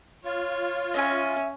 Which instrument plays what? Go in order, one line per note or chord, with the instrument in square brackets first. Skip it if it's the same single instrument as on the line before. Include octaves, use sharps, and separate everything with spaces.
[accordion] F4 [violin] C#5
[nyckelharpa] C#4 [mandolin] D#5 E5 G#5